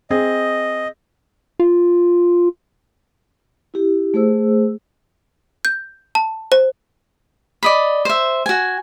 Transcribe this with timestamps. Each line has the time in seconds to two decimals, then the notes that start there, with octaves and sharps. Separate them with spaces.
0.10 C4 G#4 D#5
1.60 F4
3.74 E4 G4
4.14 A3 G#4 C5 E6
5.65 G6
6.15 A5
6.52 C5
7.63 D5 D#5 B5
8.05 C5 E5
8.46 F#4 G#5